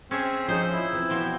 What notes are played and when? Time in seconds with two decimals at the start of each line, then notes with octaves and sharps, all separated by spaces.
0.11 C4 C#4 G#4 E5
0.48 F3 C#4 D#4 G#4 C5
0.73 E4
0.93 E3 C4
1.10 B2 F3 G5